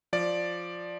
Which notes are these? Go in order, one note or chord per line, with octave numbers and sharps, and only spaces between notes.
F3 D5